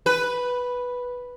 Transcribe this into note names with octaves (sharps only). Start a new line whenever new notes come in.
B4